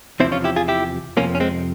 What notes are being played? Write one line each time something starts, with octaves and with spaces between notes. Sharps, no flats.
E2 C3 F3 C4 E4
C#4 F4
E4 G4
F4 G#4
E4 G4
F2 C3 F3 A#3 C#4
C#4
G#3 C4